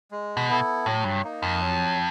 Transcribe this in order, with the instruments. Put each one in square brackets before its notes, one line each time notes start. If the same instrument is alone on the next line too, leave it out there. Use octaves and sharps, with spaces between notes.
[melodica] G#3
[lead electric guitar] B2
[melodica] B3 E4 A4
[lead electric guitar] A2 [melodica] F#3
[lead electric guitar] G2
[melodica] A#3 D#4
[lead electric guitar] F2
[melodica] F#3